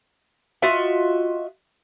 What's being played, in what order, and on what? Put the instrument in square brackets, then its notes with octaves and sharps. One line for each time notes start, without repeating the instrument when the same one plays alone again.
[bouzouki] F4 F#4 D#5 E5